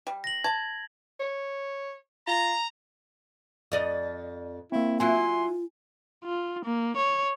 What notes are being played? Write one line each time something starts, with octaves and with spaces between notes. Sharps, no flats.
G3
A#6 F#7
A5 G#6
C#5
F4 A#5
F2 D5 D#5
A#3 C4 E4
F#3 E4 F4 G#5 C6
F4
A#3
C#5